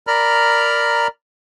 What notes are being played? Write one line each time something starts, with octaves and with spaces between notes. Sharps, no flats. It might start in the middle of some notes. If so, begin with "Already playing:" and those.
A#4 D5 A#5 B5 F6